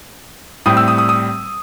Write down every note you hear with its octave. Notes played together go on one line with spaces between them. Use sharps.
A2 G3 C4 D#6
E6
D#6
D#6
D#6